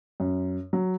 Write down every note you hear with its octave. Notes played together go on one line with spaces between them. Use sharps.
F#2
F#3